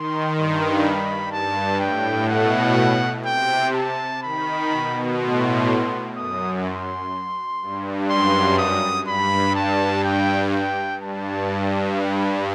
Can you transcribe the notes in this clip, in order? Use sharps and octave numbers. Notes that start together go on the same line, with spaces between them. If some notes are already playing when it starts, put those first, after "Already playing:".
Already playing: D#3 C6
G2 C6
B5
G2 A5
A2 G5
B2 F#5
C3 G5
A5
D#3 B5
B2
A2 C6
F#2 D#6
C6
G2
F#2 C6
D#6
G2 B5
A5
G5
G5
G2 A5
G2
B5